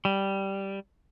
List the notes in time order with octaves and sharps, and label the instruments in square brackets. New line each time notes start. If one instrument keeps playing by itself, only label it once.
[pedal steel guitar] G3